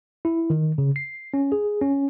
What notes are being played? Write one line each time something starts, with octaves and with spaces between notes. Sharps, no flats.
E4
D#3
C#3
C7
C#4
G#4
C#4